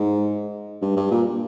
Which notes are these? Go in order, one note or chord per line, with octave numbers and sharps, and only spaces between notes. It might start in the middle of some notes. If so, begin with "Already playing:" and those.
Already playing: G#2
G2
G2
A#2